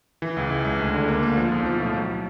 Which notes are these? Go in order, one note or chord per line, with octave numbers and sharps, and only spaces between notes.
E3
C#2
C#2
C#2
D2
D3
A#3
A#3
F3
B1
F3
A2
F#3